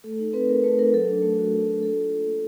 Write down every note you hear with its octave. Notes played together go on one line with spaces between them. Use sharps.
A3 A4
D#4
C4 B4
A3 A#4
A3 B4
D#4 A#4
F#3 A4
D4
A3
F#4
F#3
D4
A#3 A4
F4
D4
A#3